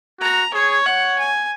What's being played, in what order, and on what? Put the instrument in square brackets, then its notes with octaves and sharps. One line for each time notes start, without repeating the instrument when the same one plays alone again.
[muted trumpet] F#4 [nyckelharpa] A#5
[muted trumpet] G#4 [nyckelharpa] C#5
[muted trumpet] C#5 [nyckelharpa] F#5
[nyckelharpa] G#5